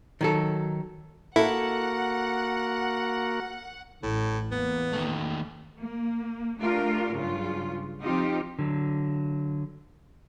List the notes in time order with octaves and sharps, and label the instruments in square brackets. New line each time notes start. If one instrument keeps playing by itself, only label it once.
[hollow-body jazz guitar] D#3 F#3 A4
[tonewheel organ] A#3 F#4 A#4 [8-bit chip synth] E4 [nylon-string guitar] A4 [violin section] F#5
[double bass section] A1 [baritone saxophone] A2
[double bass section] E2 A#3 [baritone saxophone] B3
[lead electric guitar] D#3 A3
[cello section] A#3
A3 D4 F4 G4 A#4
G2 C#3 F#3 F4
F3 C4 D#4 F4 G4
[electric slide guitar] D3 F#3